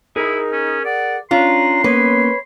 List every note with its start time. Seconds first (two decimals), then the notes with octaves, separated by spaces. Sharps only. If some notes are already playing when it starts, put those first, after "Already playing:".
0.16 D#4 E4 G#4 A#4
0.52 C#4
0.85 D5 F#5
1.31 C#4 D4 F4 A#5 C6
1.84 A#3 B3 C#4 B4 C#5